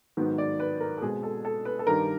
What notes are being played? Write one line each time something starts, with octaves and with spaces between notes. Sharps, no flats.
G#2 D#3 F#3 B3
D5
B4
A#4
A4
B2 G#3 C4 G#4
A4
A4
B4
A4
G2 D#3 G3 A#4